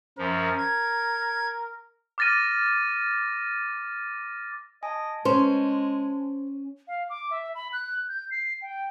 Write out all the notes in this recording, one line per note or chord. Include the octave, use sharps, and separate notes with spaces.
F#2 F3 A#4
G#6
D6 F6 A6 A#6 D#7
D#5 G#5 A5
G#3 C#4 C5
F5
D6
E5
B5
F#6
G6
C7
G5